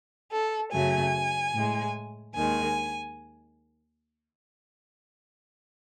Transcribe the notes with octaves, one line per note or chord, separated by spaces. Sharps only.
A4
F#2 C#3 F#3 A3 G#5
A2 G#3
D#2 D#3 G#3 G#5